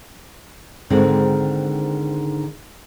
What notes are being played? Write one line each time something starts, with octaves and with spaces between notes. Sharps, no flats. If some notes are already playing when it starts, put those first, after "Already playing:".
G#2 D3 D#3 G#3 C4